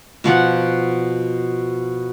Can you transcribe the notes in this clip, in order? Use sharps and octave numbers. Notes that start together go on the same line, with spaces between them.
B2 F3 F#5